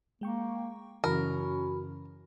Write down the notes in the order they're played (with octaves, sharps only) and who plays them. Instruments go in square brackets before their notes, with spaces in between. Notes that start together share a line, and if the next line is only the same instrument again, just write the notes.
[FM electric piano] G#3 G5 C#6 [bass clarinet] A#3
[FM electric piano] F#2 C#3 E3 [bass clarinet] C#4 [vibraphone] F#4 B5 [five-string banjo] A#4